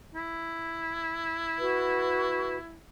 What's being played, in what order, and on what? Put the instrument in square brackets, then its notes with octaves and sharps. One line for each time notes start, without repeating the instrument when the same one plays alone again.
[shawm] E4
[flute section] F#4 B4